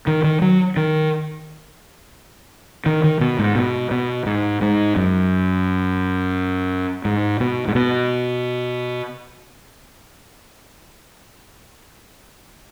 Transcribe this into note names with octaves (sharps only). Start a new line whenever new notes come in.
D#3
D#3
F#3
D#3
D#3
D#3
B2
G#2
B2
B2
G#2
G#2
F#2
G#2
B2
G#2
B2